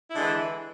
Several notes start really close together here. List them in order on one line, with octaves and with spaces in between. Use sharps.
E4 D3 G#3 E3